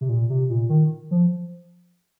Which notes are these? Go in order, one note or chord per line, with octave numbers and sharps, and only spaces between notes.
C3
A#2
C3
A#2
D#3
F3